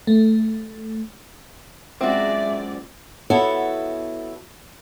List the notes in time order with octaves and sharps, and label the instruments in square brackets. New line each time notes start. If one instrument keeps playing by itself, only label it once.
[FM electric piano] A3
[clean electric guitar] F#2 A#2 [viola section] G#3 D5 [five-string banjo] C4 F#4 [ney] E5
[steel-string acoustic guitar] B3 E4 F#4 A4 C#5 E5